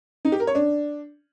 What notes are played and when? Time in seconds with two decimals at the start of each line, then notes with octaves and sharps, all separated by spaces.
0.25 D#4
0.32 G4
0.40 A#4
0.47 C#5
0.55 D4